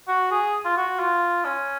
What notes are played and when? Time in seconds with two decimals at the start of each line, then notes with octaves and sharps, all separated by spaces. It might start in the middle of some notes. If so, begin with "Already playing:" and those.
0.08 F#4
0.31 G#4
0.65 F4
0.77 F#4
0.99 F4
1.45 C#4